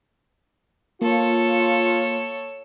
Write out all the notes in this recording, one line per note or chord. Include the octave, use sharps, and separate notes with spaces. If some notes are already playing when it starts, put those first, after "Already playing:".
A#3 F4 A4 C#5